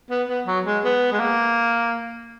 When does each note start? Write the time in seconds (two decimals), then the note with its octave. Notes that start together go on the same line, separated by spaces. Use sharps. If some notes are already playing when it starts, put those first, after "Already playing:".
0.10 B3
0.29 B3
0.46 F#3
0.66 G#3
0.84 B3
1.12 G#3
1.19 A#3